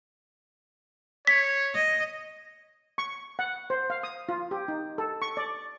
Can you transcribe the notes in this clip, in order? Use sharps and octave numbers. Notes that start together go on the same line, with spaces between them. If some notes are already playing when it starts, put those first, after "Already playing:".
C#5 B6
D#5
C#6
F#5
C5
F5
D#6
F4
G4
D#4
A4
C#6
D5